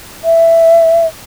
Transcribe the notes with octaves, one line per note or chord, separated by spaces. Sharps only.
E5